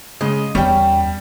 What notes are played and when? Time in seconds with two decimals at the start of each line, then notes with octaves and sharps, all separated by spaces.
0.21 C#3 G#3 D#5
0.55 E2 G3 C#4 G5